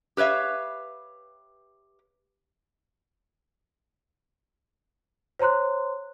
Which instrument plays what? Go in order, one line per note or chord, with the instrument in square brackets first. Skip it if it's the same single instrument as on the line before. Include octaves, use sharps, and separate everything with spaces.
[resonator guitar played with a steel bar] G4 B4 C#5 E5 F5
[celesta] C5 C#5 A#5 C6 F#6